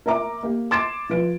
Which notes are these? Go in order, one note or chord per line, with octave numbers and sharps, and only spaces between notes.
A#4 E5 A#5 D6
A#3 G4
C6 D6 G#6 A6 D7 E7
F3 B4 D7